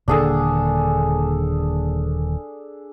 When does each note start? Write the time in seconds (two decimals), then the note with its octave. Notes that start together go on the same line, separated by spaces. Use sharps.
0.08 D#1 D3 A#3 D4 G#4 A4